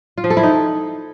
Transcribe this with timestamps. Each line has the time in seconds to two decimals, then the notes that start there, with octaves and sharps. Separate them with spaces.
0.18 F4
0.24 F3
0.30 A4
0.37 E4
0.43 D#4